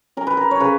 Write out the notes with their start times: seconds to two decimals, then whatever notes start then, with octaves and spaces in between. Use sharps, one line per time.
0.17 C#4 A#4
0.27 B4
0.37 A#4
0.51 C#5
0.60 C#3 B4